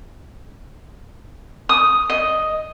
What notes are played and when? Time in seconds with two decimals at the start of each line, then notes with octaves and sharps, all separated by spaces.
1.69 D#6
2.10 D#5